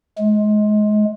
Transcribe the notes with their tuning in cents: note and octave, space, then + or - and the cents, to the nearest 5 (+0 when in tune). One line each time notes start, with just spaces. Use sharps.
G#3 +25